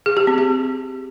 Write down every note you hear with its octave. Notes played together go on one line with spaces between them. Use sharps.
G#4
G4
C4
G4